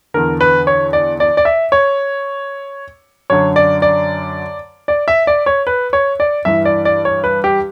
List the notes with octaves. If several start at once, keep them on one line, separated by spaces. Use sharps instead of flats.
E2 D3 A#4
B4
C#5
D5
D5
D5
E5
C#5
F#2 D3 C#5
D5
D5
D5
E5
D5
C#5
B4
C#5
D5
G2 E3 E5
D5
D5
C#5
B4
G4